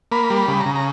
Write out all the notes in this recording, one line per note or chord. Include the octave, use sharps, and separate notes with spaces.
A#3 B5
G3
B5
C#3
A#5
C#3
A#5